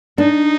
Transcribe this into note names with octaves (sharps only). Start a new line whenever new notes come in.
D4 D#4